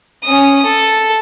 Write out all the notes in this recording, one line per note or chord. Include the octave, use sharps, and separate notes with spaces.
C#4 D#6
A4